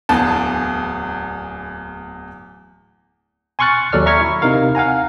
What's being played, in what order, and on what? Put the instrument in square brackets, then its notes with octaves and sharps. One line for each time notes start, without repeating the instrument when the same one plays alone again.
[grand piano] D1 E2 A5
[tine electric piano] G#5 C6 C#6 F6 F#6 A6
D#2 F#3 A4 D5 F6
E5 A#5 C#6 F6 G#6
E4
C3 D#4 A#4 F5
F5 F#5 G#5 A#5